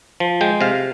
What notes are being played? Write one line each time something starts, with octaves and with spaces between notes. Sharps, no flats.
F3
G#3 G5
C3 F5